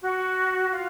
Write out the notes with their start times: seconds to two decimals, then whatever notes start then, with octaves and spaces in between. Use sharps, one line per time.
0.01 F#4
0.72 F4